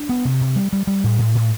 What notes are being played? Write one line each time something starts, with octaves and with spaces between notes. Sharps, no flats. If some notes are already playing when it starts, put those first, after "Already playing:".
Already playing: D4
B3
C3
C3
G3
G3
G3
A2
A2
A2